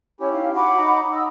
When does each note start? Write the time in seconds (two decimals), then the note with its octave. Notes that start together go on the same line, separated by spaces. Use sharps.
0.21 C#4 E4 G4 C#5
0.32 D#4 F5
0.55 F#4 F#5 B5 D6
0.78 D#4 A#5
1.12 D#5 E6